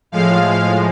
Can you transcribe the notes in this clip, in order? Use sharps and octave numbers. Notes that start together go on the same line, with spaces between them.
A2 F3 G#3 F5